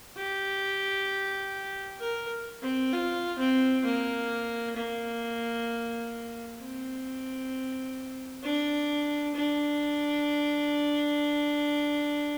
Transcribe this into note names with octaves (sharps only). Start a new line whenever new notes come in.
G4
A#4
C4
F4
C4
A#3
A#3
C4
D4
D4